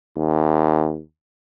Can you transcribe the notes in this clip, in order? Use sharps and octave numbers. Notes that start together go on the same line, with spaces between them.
D#2